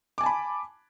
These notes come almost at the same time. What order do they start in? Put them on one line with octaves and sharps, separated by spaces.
D6 G#5 A5 B5